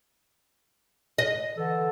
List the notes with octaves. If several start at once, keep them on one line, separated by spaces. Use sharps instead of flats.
D#5
D3 E3 A4